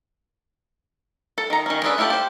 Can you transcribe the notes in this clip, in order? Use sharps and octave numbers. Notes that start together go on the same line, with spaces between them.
A4
D#3 A#5
D#3 C#4
C#4 D4 G#4 A4 B4
A3 E4 F4 G4 A5
G4 C5